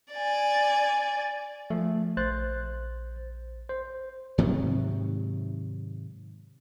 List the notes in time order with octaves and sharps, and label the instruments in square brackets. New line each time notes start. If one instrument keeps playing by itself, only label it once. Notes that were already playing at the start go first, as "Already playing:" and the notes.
[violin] D5 G#5
[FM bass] F3 [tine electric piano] A3
[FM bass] A#1 [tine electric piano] C5 F#6 A6
[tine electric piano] C5
[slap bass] G#2 C3 D#3 F#3